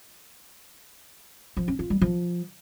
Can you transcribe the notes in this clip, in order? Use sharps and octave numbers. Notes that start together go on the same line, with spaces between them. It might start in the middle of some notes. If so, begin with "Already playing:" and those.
F3
C#4
F4
G3
F3